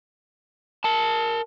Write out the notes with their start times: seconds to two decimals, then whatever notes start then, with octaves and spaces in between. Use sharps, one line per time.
0.84 A#4 A5